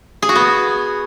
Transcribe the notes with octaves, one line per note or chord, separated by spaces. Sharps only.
G#4
F#4
B3